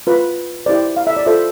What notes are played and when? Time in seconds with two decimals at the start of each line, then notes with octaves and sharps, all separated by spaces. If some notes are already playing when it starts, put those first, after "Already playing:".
0.07 F4 B4
0.66 E4 G4 C5 D5
0.97 F5
1.07 E5
1.17 D5
1.26 F4 A4 C5 E5